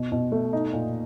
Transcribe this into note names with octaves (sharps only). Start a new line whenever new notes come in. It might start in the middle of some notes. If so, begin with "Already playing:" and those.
Already playing: B2
B2
A3
D#4
A#2